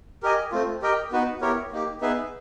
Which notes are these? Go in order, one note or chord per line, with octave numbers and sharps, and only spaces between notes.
G4 A#4 D#5 G#5
A3 C4 F4
G4 A#4 D#5 G5
B3 D#4 F#4 B4
B3 E4 G4 A#4 C#5
A#3 D#4 G4
B3 D#4 G#4 B4 E5